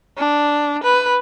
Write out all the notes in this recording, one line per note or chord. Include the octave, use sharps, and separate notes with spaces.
D4
B4